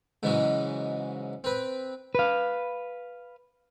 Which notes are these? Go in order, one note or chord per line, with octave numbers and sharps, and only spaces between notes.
G#2 C#3 E3 F#3 G#3
C4 B4
B4 F5